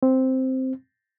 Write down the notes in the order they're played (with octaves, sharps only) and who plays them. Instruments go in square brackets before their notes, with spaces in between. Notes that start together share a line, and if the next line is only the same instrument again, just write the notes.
[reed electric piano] C4